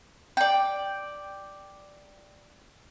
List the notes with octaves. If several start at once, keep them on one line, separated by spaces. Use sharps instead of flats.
D5 G5